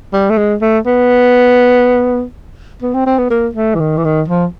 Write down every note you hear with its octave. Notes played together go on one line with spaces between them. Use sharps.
G3
A3
G#3
A3
B3
B3
C4
C4
B3
A#3
A3
E3
D#3
E3
D#3
F3